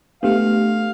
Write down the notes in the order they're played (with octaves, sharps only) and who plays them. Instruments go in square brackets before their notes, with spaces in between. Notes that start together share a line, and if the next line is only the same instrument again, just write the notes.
[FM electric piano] A3 B3 [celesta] D4 G4 [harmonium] F5